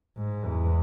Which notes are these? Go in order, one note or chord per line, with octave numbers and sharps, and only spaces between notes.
G#2
E2